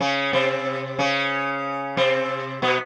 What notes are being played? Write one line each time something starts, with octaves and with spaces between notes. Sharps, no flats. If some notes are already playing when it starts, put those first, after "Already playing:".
C#3 C#4
C3 C4
C#3 C#4
C3 C4
B2 B3